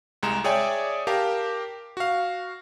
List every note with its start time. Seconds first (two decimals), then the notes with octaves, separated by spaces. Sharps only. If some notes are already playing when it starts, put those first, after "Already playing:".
0.23 C2 G#3 A#5 E7
0.44 G#4 C#5 D5 E5 G5 G#5
1.07 G4 A#4 F5 A5
1.97 F#4 F5